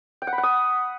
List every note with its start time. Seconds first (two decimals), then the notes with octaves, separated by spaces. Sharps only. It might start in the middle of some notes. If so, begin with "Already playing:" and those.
0.22 G5
0.27 F#5
0.33 B5
0.38 F#5
0.43 D#6